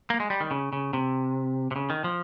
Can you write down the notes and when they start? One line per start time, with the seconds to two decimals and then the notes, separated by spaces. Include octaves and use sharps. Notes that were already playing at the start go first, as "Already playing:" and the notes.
0.10 A#3
0.20 G#3
0.30 G3
0.40 D#3
0.51 C#3
0.73 C#3
0.93 C3
1.71 C3
1.76 C#3
1.90 D#3
2.04 F3